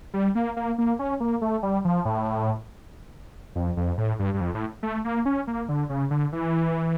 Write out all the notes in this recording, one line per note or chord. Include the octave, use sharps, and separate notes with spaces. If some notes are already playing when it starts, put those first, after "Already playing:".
G3
A#3
A#3
A#3
C#4
A#3
A3
G3
F3
A2
F2
F2
A2
G2
G2
F2
A2
A3
A#3
C#4
A#3
D3
C#3
D3
E3